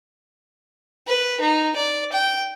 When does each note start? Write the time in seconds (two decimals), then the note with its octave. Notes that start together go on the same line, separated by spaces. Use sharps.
1.07 B4
1.40 D#4
1.76 D5
2.12 G5